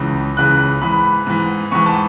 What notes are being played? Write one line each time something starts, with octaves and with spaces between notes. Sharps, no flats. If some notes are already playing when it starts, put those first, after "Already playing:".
Already playing: C#2 C#3 E3
C#2 C#3 E3 F#6
G#2 E3 B5
G#2 E3
G#2 E3 C#6
A5